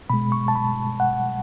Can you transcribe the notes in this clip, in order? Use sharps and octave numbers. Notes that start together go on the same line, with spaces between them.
B2 G#3 B5
C#6
A5
B5
F#5